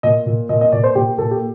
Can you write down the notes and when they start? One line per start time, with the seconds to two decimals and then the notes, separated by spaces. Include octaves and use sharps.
0.03 A#2 D#5
0.26 A#2
0.49 A#2 D#5
0.61 D#5
0.72 A#2 D5
0.84 C5
0.95 A#2 G4
1.18 A#2 A4
1.31 G4